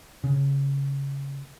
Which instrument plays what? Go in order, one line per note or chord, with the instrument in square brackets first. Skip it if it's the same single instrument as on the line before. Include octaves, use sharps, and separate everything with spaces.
[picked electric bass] C#3